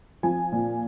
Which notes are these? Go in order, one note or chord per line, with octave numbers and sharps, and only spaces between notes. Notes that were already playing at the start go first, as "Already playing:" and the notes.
F3 G#5
A#2